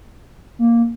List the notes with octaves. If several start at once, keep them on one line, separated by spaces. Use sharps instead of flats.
A#3